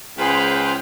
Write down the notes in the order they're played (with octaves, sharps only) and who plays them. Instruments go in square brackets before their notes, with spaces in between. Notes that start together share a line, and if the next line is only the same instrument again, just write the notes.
[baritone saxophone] C#2 [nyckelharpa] G#4 [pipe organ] B4 F5 [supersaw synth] C5 G5